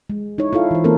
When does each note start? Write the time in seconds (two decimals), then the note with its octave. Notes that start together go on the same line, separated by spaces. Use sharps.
0.10 G#3
0.38 D#4 E4 C#5
0.53 E4 F4 A4 F5
0.71 E3 C5
0.84 E3 A#3 C4 C#4 A4 A#4